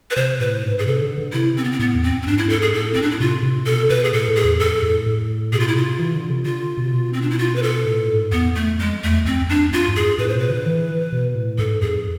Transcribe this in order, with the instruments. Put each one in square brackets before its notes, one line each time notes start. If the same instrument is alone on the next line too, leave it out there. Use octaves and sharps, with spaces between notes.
[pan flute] B4
[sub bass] C3 [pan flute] C5
[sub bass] A2 [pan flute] B4
[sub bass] G#2
[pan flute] G#4
[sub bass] C3 [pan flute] A4
[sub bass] D3
D3
[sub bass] C3 [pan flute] E4
[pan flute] C4
B3
C4
[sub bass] A2 [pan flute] B3
[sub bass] E2
[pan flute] C4
C4
[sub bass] G#2 [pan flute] D4
[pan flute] E4
A4
G#4
[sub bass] A2 [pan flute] A4
[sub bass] A2 [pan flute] C4
[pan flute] D4
E4
[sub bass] C3 [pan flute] F4
[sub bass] C3
[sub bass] B2 [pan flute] A4
[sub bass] B2 [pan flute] B4
[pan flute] G#4
[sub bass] A2 [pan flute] A4
[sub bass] A2
[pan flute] G#4
[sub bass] E2
[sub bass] F2 [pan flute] A4
[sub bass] A2
A2
[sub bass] B2 [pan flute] G#4
[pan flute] F4
E4
[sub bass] C3 [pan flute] F4
[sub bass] E3
D3
C3
[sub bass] D3 [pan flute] F4
[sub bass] B2
C3
B2
[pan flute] C4
D4
E4
F4
B4
A4
[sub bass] A2
G#2
[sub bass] E2 [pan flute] B3
[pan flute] A3
[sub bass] F2 [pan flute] G#3
[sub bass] E2 [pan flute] A3
[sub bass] F2 [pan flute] C4
[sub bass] F2
[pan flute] D4
[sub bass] F2 [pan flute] F4
[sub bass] G#2
[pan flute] G#4
[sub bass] A2 [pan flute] B4
[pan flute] C5
[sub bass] B2 [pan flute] B4
[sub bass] D3
E3
B2
A2
[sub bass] G#2 [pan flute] A4
[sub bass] F2 [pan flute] G#4